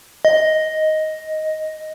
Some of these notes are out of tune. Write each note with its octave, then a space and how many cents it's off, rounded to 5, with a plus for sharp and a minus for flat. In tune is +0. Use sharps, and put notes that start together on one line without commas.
D#5 +5